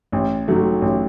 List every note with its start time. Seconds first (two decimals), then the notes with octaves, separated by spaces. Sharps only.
0.12 A1
0.48 G#2 D#3 F#3 A3
0.82 A1